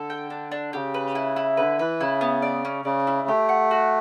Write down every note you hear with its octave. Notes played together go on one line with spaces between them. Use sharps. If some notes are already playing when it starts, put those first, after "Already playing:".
Already playing: D3 A4
G5
D4
D4
C#3 G4
B4
E4
E4
D3 B4
E3 B4
C#3 E4
B3
D5
C#4
C#3 D5
E4
A3 G4
F#5
F#4